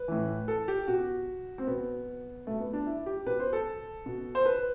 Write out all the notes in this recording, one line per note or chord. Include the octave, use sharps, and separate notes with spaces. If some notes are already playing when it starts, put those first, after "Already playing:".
Already playing: B4
A2 E3
A4
G4
B2 F#4
C4
B2 B3
B2 A3
B3
D4
E4
G4
B2 B4
C5
A4
B2
C5
B4